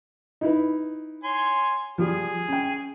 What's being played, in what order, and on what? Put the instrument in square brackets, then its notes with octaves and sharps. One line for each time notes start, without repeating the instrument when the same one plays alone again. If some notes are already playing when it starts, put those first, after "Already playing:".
[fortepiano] D#4 E4 B4
[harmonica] C#5 G#5 C6
[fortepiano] F3 G3 [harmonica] G#4
[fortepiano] C#4 G5